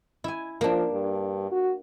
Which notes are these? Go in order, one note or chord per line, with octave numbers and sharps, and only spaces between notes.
E4 G#5
F3 A#3 D4
G2
F#4